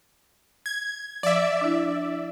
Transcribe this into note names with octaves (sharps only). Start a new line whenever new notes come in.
G#6
F3 D5 E5
D4 E4